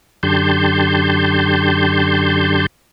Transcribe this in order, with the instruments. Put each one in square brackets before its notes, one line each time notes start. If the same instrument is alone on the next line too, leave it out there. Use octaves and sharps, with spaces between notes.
[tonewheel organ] F#2 D3 G4 A5 C6 G6